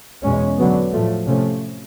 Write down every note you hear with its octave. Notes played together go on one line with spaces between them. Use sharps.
E2 B2 G#3 C#4
D3 F#3 B3
A2 F3 A3
C3 F3 A3 C#4